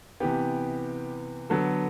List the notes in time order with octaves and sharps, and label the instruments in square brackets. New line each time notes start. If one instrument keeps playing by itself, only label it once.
[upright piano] C3 E3 B3 G4
D3 F#3 B3 A4